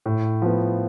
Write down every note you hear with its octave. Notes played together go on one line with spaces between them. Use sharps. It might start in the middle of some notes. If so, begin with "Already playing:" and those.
A2
F3 B3